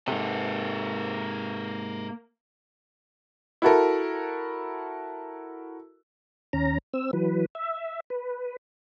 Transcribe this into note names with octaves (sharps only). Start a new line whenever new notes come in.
G#2 C3 A#3 A4
E4 F#4 A4 A#4
D#2 C#4 A#5
C4 E6
E3 F#3 B4
E5
B4